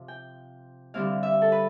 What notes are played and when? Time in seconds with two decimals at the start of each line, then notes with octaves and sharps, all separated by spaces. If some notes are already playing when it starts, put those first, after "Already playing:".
Already playing: C3 F3
0.08 G5
0.94 D3 G3 C4 E4 F5
1.23 E5
1.42 A4
1.52 B4